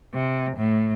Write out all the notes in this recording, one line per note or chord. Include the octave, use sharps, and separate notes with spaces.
C3
A2